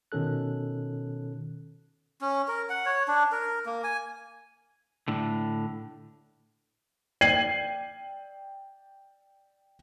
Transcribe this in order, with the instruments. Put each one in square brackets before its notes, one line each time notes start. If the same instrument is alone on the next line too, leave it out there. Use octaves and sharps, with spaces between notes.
[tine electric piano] B2 D#3 C#4 A4 F#6
[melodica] C#4
A#4
F#5
C#5
D4
A#4
A#3
G#5
[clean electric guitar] A2 D3
[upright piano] D5 G5 G#6 C7 D#7 F#7